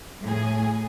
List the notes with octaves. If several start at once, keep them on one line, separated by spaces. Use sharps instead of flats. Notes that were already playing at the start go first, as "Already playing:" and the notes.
A2 G#4